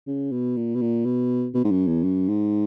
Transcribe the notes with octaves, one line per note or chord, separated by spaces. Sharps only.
C#3
B2
A#2
B2
A#2
B2
B2
G#2
F#2
E2
F#2
G#2